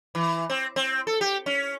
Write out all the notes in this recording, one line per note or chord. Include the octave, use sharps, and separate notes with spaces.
E3
C4
C4
A4
G4
C#4